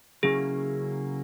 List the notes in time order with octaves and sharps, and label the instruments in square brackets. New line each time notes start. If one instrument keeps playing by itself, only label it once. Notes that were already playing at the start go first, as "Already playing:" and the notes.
[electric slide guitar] C#3 F#3 A#3 C#4 E4 [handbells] G#4